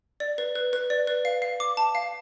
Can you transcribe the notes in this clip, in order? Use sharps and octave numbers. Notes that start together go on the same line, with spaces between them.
D5
B4
B4
B4
D5
B4
F5
F5
D6
A5
F5